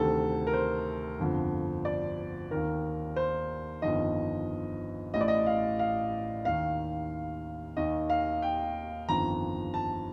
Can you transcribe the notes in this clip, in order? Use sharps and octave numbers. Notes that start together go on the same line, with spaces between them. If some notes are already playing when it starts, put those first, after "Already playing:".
Already playing: D2 C3 D#3 A4
A#4
C5
G1 F2 D3
D5
D#2 D#3 A#4
C5
G1 F2 D#3 D#5
A1 A2 D#5
D5
D#5
F5
F5
D#2 D#3 F5
D#2 D#3 D#5
F5
G5
G1 F2 D#3 A#5
A5